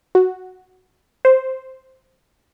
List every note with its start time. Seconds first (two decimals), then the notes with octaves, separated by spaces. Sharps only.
0.15 F#4
1.25 C5